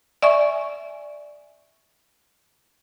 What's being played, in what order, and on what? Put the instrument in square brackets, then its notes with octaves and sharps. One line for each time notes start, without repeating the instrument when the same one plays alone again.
[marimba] D5 E5 G#5 C#6